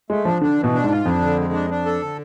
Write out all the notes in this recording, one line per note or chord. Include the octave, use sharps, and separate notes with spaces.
G#3 A3
F3 D4
D3 D4
E3
B2
D4
G#2
F4
F2 D4
D3
G#3
D4
D4
A4
D3